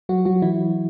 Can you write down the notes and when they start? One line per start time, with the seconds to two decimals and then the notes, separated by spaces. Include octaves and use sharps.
0.09 F#3 F#4
0.25 F#3 F#4
0.42 E3 E4